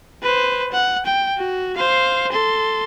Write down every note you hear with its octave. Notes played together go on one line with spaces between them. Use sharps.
B4 C5
F#5
G5
F#4
C5 F5
A4 C6